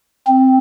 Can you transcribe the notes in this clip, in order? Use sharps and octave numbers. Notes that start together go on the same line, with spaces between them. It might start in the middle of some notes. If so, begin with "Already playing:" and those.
C4